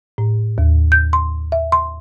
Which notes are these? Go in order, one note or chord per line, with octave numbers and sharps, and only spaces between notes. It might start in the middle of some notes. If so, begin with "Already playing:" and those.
A2
D#2
G6
C6
E5
C6